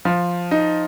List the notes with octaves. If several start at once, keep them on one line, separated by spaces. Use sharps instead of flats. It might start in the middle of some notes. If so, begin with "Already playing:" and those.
F3
D#4